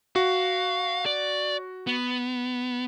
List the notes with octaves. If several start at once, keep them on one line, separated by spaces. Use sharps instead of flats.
F#4 F5
D5
B3